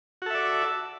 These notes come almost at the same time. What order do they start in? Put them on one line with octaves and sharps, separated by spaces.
F#4 A4 E5 D5